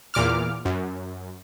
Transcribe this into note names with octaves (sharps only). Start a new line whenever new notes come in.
E2 A#2 D6 F6
F#2